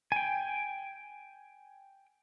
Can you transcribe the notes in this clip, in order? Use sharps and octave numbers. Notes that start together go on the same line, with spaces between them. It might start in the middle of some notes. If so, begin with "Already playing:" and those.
G5 G#5